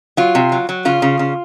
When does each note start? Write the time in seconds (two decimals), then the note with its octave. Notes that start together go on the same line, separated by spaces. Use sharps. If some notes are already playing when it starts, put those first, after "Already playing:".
0.17 F#3 F4
0.35 C3
0.52 F#3
0.69 F#3
0.85 C#3 F4
1.02 C#3
1.19 C#3